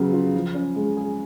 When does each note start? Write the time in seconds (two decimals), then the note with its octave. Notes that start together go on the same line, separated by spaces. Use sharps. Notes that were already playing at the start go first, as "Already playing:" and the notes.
Already playing: C#3 F#3 B3
0.13 F4
0.34 F3
0.55 C#4
0.76 G#3
0.97 G#4